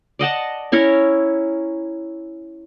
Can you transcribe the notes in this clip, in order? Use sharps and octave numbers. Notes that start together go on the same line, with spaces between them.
D5 D#5 F#5 A5
C#4 E4 A#4 C#5